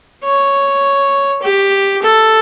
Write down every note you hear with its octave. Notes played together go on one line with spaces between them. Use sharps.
C#5
G4
A4